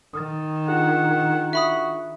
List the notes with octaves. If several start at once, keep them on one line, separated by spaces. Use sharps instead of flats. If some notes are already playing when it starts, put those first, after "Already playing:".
D#3 D#6 F6 A6
D4 F4 G#4 F#5
F#4 E5 B5 D#6